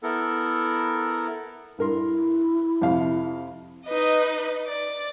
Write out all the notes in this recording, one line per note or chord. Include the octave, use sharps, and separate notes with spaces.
B3 E4 A4 A#4
G2 E4 A#4 C6
F2 C3 F5
D#4 B4 D#5
D5